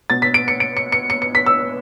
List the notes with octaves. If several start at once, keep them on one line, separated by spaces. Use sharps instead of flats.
B2 A6
B6
D7
C#7
D7
C#7
C#7
C#7
C#7
B6
E6